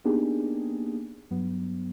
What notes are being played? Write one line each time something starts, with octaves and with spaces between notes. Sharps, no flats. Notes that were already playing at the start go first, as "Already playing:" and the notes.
A#3 B3 D4 D#4 G4 G#4
G2 F#3 B3